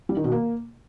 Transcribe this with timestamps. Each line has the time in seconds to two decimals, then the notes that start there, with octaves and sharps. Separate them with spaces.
0.09 G3
0.17 D#3
0.24 B2
0.32 A#3